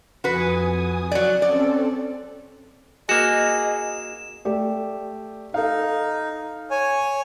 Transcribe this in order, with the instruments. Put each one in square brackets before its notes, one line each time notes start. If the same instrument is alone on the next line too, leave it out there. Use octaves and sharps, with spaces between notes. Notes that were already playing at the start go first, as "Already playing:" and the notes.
[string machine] F2 G#5 D#6 [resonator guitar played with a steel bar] F#4 B4
[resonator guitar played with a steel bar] F#3 D5
[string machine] C4 C#4 A4 [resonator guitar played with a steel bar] D5
[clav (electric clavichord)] A#3 F#4 [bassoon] G#4 [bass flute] D#5 [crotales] E7
[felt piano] A3 G4 D5
[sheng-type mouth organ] D#4 [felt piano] A4 F5
[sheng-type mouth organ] C#5 G#5